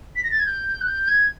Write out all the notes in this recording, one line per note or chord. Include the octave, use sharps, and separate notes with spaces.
B6
A#6
A6
G#6
G6
F#6
G6
G#6